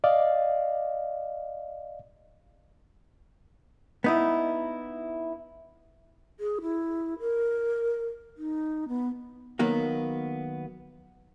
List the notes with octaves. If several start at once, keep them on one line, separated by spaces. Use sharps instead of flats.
D5 D#5 F5
B3 D#4 E4
G#4
E4
A#4
D#4
B3
D#3 F#3 A#3 B3